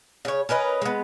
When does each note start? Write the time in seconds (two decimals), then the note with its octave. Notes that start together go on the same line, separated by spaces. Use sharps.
0.25 C#3 C#5
0.49 C#4 A#4 B4 D#5
0.82 G#3 B3